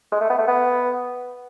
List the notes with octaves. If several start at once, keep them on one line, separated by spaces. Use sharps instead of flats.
G#3
A3
B3
A3
B3